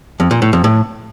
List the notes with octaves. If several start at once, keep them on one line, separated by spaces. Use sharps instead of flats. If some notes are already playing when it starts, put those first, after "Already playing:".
F2
A#2
A2
F2
A2